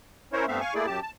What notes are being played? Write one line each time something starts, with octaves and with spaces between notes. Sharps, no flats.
C#4 E4 A#4 C5 C#5
G2 A3 B3 C4 E5 F5
F5 G#5 C#6
A3 A#3 E4 G#4 D5
F#2 G4 A5
A5